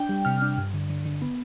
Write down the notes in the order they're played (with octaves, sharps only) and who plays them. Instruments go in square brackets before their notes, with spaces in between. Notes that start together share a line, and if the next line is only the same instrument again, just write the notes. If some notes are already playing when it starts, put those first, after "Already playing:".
Already playing: [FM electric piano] D4 G5
G3
C3 F6
D4
G2
D3
D3
D3
B3